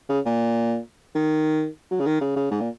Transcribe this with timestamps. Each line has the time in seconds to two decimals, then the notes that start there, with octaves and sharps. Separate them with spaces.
0.09 C#3
0.25 A#2
1.15 D#3
1.91 F#3
2.00 C#3
2.06 D#3
2.21 C#3
2.36 C#3
2.51 G#2
2.60 A#2